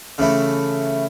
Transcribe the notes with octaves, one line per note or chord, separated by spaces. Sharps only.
C#3 E3 A3 E4